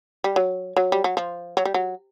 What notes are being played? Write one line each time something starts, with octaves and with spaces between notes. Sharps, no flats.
G3
F#3
F#3
G3
F#3
F3
F#3
G3
F#3